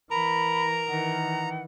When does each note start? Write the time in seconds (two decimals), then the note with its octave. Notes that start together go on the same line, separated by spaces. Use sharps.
0.11 E3 A#4 A#5 B5
0.88 D#3 E3 F#5